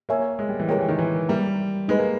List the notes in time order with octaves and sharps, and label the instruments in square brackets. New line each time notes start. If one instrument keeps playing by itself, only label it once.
[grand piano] A#3 [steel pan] A#4 C#5 E5 G#5
[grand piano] G#3
G3
E3
[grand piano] G#3 [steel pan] G4 A#4 C#5 G5
[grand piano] E3
D#3
E3
[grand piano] G3 [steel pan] G4 A#4 E5 G5 A#5
[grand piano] G#3 [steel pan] D#4 G#4 B4 D#5
[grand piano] A#3